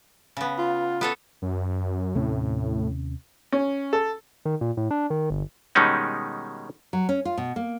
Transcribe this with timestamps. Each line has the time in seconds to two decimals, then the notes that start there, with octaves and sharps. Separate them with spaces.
0.37 C#3 B3
0.59 F4
1.01 B3 A4 C#5
1.42 F#2
2.15 D#2 A2 C3 C#4
3.52 C#4
3.93 A4
4.45 D#3
4.61 A#2
4.77 A2
4.91 D4
5.10 D#3
5.30 G1
5.75 B2 D#3 G3 G#3 C#4 D#4
6.93 F#3
7.09 C#4
7.25 F4
7.38 B2
7.56 A#3